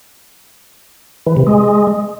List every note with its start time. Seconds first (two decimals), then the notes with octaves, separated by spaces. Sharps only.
1.26 E3
1.37 C3
1.47 G#3